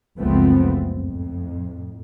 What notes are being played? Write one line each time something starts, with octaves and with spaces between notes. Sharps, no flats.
F#1 C#2 F3 A3 B3 C4
F2 A2